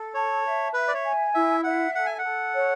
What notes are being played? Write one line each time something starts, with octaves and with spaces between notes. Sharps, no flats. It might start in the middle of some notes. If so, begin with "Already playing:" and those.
Already playing: A4
C#5 A5
E5
B4 E5
D5
C#5
G#5
E4 E5
E5 F#5
A4 F#5
G#5
F#5
A4
C#5